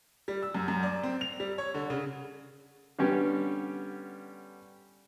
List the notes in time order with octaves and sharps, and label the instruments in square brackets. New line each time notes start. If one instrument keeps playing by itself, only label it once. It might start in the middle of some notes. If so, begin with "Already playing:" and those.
[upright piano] G3
E6
F#2
F#2
D5
C4
F7
G3
C#5
D3
C#3
[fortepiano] D3 G3 B3 C#4 G4